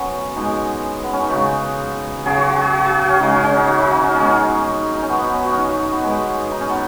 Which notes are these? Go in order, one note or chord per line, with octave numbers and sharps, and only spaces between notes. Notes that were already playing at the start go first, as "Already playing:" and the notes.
Already playing: B2 F#3 B3 C#4
B2 G#3 D#4
B3
C#4
D#4
C#3 G#3 F#4
C#3 F#3 G#4
F#4
F#4
G#4
F#4
G#4
F#4
C#4
C#3 G#3 D#4
C#4
C#4
D#4
F#4
D#4
F#4
C#4
B2 G#3 C#4
D#4
C#4
B2 F#3 B3
B3
C#4
F#4
C#4
D#4
F#4
D#4
B3
B2 G#3
D#4
C#4
B3